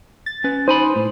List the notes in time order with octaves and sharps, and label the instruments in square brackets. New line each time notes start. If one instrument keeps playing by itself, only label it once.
[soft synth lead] A6
[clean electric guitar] C#4 B4
[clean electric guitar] D#4 G#5 B5 [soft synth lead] C5
[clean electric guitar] A2